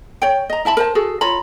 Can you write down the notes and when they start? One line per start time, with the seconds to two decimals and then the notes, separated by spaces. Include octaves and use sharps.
0.22 C#5 G5
0.50 D#5 A#5
0.65 E4 E5 A5 B5
0.77 A#4 C5 A5
0.95 F#4 G#4 A4
1.21 F4 C#5 A#5 B5